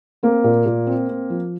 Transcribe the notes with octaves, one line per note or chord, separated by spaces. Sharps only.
A#3 C4
A#2
A#2
C4
C4
F3